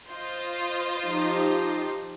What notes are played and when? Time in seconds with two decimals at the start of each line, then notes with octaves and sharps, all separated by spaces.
0.10 F4 C5 D#5
1.05 F3 D#4 G4